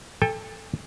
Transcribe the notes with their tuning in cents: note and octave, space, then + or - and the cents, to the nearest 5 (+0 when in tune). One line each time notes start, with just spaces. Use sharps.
A4 -5 G5 +35